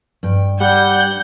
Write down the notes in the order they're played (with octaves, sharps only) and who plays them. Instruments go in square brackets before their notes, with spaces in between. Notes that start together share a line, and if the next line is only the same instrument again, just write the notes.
[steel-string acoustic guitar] G2 G5
[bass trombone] G3 [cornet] F#5 [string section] G6